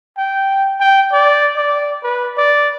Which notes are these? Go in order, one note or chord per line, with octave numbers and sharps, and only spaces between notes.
G5
G5
D5
D5
B4
D5